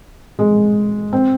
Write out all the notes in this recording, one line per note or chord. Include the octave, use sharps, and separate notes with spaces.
G#3
C4